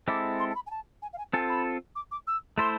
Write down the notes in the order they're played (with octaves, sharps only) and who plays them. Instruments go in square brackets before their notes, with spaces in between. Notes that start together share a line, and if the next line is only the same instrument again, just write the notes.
[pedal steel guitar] G#3 C4 E4 A4 [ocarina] D6
[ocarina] C6
A5
B5
G#5
A5
G#5
F5
G#5
[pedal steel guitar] C4 F4 A4 [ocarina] G#5
[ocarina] B5
D6
D6
E6
[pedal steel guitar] A3 E4 A4 C5 [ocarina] C6